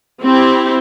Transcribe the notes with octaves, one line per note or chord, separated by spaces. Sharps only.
C4 E4 G4